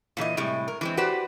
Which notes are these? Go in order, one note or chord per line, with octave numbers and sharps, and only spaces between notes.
A#2 E3 A4 D#5
A2 C3 G3 G#3
A#4
E3 G#3 C4
F#4 G4 B4 C5 D5